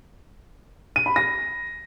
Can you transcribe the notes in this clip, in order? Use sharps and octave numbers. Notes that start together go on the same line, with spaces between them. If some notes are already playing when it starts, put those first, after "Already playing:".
D#7
B5
A#6